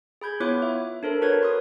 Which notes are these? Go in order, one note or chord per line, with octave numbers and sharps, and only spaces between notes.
G#4 B5 G6 G#6
B3 E4 F4 C#5 D6 F#6
E5
D4 A4 A#4 C5
F#4 A#4 B4 C#5 G#6
C6 D#6